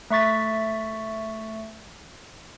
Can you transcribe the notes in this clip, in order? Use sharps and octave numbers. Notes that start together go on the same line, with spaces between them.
A3 E5 C#6 A6 B6